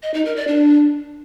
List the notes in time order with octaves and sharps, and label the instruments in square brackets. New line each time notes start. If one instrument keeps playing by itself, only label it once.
[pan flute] D#5
D#4
A#4
D5
D4